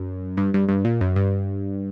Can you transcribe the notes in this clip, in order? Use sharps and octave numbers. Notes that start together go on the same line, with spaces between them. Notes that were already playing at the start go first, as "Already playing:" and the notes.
Already playing: F#2
G2
G2
G2
A#2
F#2
G2